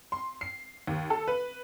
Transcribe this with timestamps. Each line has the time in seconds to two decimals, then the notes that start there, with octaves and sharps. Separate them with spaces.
0.12 C6
0.41 C7
0.87 D#2
1.10 A4
1.28 B4